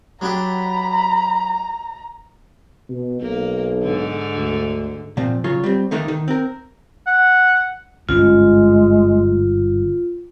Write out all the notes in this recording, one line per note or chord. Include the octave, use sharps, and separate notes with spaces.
F#3 D4 G4 A#5 B5
B2
B1 A#3
G#2 D3
D2
A#2 F3 C4
C#3 F#3 F4 C#5
G3 C4
D3 D#3 A3 A#3 D4 D#4
D#3
C4 A#4
F#5
G1 G#2 G#3 C#4 F4